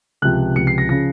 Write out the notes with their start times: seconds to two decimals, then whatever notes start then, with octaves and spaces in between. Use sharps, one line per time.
0.22 C#2 C3 F3 F#6
0.55 C#2 C3 F3 C#7
0.67 C7
0.78 A#6
0.89 C#3 F3 A#6